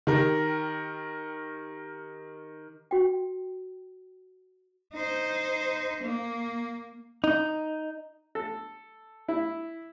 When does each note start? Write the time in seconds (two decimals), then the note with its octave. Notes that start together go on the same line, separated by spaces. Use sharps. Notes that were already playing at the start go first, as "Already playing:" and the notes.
0.07 D#3 G4 A#4
2.91 F#4 G5
4.94 D#4 C5
6.03 A#3
7.24 D#4
8.35 A4
9.28 E4